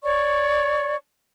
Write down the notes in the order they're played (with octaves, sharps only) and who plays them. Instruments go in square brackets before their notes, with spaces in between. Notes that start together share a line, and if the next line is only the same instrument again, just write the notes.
[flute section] C#5 D5 C#6